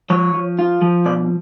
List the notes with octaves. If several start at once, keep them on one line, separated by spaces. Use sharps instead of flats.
F3 C#5
F3
F4
F3
B2 D5